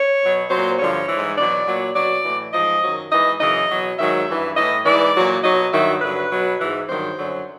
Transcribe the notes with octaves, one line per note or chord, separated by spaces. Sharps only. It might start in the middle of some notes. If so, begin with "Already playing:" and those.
Already playing: C#5
B2 F#3
A#2 F#3 C5
G2 D3 F3 C#5
G#2 E3
B2 F#3 D5
A#2 F#3
B2 F#3 D5
A2 E3
G#2 F3 D#5
F#2 D#3 F#3
G#2 E3 D#5
F#2 C#3 E3 D#5
B2 F#3
G#2 D#3 F#3 E5
G2 E3
A2 E3 D#5
G#2 E3 D5
A#2 F#3
B2 F#3 D#5
G2 D#3 F#3 E5
G2 D3 F#3 B4
B2 F#3
G#2 E3
G2 D#3 F#3 C5
F#2 D3 F#3